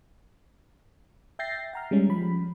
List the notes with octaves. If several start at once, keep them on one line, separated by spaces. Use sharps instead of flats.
E5 G5 G6 A6 A#6 C7
F#5 A#5 F6
G3 G#3 C#4
F3 B5